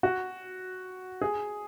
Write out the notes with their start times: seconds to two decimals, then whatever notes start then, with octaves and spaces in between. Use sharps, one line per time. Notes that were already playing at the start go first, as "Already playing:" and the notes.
0.03 F#4
1.22 G#4